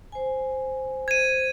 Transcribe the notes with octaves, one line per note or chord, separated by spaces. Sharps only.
C5 G#5
C5 G#6 D#7